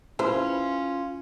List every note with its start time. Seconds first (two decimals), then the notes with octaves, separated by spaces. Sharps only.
0.19 C#4 E4 F4 B4 C5